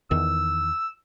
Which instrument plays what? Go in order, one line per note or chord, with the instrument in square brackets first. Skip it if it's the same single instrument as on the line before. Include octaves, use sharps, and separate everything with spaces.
[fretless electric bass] E2 D#3 [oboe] E6